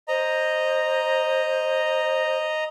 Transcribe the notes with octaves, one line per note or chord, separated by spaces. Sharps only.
C5 D#5 A#5